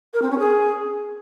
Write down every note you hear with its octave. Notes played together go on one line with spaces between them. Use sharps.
A#4
C4
C#4
G#4